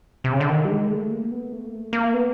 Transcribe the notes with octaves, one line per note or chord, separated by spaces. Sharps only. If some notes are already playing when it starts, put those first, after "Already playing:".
C3
C#3
D3
D#3
G3
G#3
A3
A#3
B3
A3
A#3
A3
A#3
B3